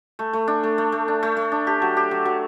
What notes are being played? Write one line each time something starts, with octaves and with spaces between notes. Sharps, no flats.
A3
A3
D4
A3
A3
A3
D4
A3
A3
D4
G4
F#3
G4
F#3
F#3